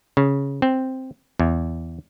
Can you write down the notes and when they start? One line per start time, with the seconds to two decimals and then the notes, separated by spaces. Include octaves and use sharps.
0.17 C#3
0.62 C4
1.40 E2